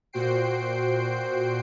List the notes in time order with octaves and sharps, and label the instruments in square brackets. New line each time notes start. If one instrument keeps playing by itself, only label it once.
[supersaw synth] A#2 F#4 C5 G5 C7 D7